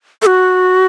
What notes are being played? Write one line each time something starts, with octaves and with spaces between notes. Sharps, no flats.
A4
F#4